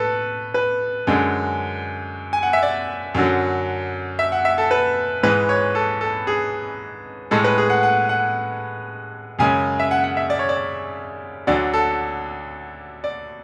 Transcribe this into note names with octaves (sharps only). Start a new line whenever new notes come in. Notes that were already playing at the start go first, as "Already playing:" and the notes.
Already playing: A2 A4 B4
B4
F#2 D3 G#3
G#5
F#5
E5
D5
F#2 D3 F#3
E5
F#5
E5
A4
B4
G#2 E3 G#3 B4
C#5
A4
A4
G#4
A2 G#3 A4
B4
G#4
F#5
F#5
F#5
F#2 C#3 G#3 G#5
E5
F#5
F#5
E5
D5
C#5
D5
D2 D3 F#3 D5
A4
D5